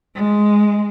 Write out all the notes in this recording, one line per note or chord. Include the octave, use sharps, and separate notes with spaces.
G#3